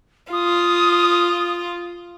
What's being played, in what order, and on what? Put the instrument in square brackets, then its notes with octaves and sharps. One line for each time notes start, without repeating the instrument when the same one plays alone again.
[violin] F4 [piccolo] D#6